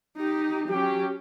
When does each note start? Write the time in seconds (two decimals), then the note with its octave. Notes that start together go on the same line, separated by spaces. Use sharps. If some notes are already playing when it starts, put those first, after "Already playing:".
0.17 D#4 G4
0.69 F#3 C#4 G4